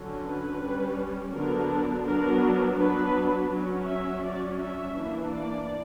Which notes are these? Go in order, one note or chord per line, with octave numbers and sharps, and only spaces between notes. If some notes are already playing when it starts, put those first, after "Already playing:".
Already playing: D3 F#3 C#4
B4
G3 C#4
D3 F#3 B3 D4 A#4
F#3 B3 D4 A#4
F#3 B3 D4 B4
F#3 C#4
E5
F#3 C#4 D5
E5
E3 A#3 D4
D5